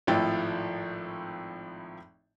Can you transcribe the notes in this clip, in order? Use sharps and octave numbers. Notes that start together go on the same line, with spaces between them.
G#1 A2 F3 E4 G5 A6